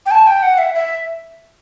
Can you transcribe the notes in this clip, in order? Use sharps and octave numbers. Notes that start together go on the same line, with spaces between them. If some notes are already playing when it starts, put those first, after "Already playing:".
G5
A5
G5
F#5
E5
E5